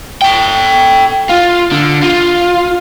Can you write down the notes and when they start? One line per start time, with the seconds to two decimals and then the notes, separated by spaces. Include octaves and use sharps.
0.22 A4 G5
1.29 F4
1.72 D3
2.03 F4